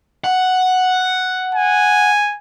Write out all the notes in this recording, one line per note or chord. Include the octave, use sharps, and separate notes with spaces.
F#5
G#5